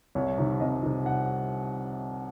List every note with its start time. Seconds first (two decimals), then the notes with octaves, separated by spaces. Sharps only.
0.15 C2 C#5
0.38 C3 D#3
0.60 C2 D#5
0.83 C3 D#3
1.06 F#5